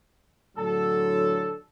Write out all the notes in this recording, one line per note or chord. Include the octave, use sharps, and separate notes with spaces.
A2 D3 F#3 A4